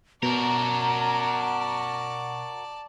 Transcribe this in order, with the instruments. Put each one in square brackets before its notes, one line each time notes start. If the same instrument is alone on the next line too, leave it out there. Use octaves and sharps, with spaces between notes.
[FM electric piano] B2 [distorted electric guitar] F#4 A#4 [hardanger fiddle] D5 A5 [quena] A#5